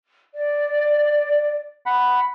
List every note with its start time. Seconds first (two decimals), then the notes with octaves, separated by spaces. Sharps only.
0.35 D5
1.86 F#5 B5